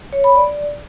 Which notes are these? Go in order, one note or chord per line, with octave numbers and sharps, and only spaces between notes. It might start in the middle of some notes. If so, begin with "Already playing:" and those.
C#5
B5
D5